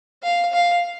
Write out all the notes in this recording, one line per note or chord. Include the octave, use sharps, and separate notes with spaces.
F5
F5